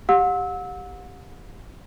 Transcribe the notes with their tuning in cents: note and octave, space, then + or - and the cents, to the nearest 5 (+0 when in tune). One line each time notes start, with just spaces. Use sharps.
G4 +0 F#5 -40 E6 -25